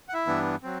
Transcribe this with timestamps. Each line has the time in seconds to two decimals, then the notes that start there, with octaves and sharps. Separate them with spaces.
0.09 F#5
0.14 E4 E5
0.26 G2 E3 B3 D4
0.63 F#3 C4